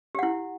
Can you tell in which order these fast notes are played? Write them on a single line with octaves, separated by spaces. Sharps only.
G4 F#5 E4